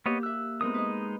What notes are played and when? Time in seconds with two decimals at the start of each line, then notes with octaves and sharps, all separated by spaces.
0.06 A#3 B3 G4 C#5 D#5
0.23 E5 E6 F#6
0.61 G#3 B3 C4 D#4 A#4 D#6
0.74 B4 D#5